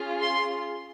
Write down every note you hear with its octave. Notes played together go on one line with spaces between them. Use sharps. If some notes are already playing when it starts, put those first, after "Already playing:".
Already playing: C#4 F4 G#4
C6